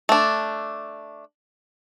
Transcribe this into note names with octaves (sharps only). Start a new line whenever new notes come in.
A3 D4